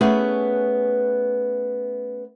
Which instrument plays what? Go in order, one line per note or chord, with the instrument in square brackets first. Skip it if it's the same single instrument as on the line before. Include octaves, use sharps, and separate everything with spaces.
[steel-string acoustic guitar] A3 B3 C#4 G#4 B4